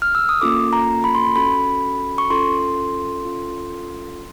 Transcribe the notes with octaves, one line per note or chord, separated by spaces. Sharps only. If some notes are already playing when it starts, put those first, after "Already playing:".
F6
E6
D#6
A#3 C#4 F4 A4 D6
A#5
B5
C6
B5
C#4 F#4 A4 B5
C#6
C#4 F4 A4 C6
C#4 F4 A4